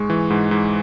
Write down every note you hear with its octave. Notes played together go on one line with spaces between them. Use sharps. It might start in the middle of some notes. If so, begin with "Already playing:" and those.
Already playing: G#2 G#3 C#6
E3
G#2
G#2